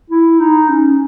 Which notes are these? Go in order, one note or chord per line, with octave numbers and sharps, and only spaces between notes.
E4
D#4
C#4